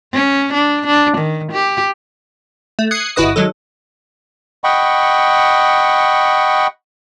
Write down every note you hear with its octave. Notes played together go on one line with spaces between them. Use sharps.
C#4
D4
D4
D#3
G4
A3
D#6 F#6 G#6 C7 C#7
G1 E4 F#4 B4 D#5 D#6
D#3 F#3 G#3 A4
D#5 F#5 G5 B5 C#6